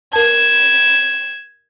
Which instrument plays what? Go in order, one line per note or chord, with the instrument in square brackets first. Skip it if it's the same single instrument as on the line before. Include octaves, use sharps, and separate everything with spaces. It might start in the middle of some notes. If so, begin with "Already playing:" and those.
[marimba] A#4 A5 [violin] G#6 E7